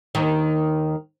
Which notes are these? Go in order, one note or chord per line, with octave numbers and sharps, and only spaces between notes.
D#2 D#3